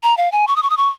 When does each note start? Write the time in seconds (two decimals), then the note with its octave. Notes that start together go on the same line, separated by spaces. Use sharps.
0.03 A#5
0.17 F5
0.32 G#5
0.48 C#6
0.56 D#6
0.63 C#6
0.70 D#6
0.77 C#6